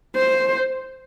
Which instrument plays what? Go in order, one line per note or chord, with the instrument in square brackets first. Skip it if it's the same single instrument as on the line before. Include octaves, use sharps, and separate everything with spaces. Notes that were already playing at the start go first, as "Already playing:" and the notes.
[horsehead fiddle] C5